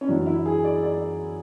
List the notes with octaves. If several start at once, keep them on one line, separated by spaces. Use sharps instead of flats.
C#4
F#2 E3 D4
E4
G#4
D5
D5